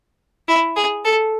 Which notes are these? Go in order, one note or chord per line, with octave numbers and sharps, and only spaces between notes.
E4
G#4
A4